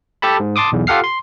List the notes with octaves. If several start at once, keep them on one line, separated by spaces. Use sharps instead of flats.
G4 A4 A5 B5
G#2
A5 C6 D6 D#6
B1 E2
F4 G4 A4 F#5 F6 C7
C6